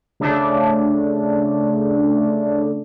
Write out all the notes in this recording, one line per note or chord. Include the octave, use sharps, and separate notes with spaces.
C#3 A3 D4